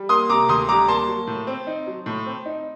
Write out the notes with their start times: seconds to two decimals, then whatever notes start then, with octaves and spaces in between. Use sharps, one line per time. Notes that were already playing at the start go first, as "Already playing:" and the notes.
Already playing: G3
0.09 A#3 C6 D#6
0.29 C3 A#5 D6
0.49 D2 C6 D#6
0.69 G3 A#5 D6
0.88 A#3 A5 C6
1.08 F#3
1.27 A2
1.47 C4
1.67 D#4
1.87 F#3
2.06 A2
2.26 C4
2.46 D#4